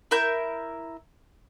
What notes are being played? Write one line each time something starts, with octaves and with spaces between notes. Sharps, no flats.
E4 A#4 E5 G6